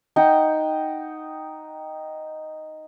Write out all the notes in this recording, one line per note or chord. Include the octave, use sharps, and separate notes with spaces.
D#4 F#5 G5